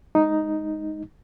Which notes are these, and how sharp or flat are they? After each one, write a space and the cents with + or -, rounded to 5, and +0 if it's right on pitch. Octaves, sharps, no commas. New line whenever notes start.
G#3 +0 D#4 +0